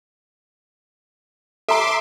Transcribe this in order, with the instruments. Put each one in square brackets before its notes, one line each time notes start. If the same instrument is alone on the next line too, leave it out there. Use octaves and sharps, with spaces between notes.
[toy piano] A4 A#5 [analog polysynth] E5 C6 D6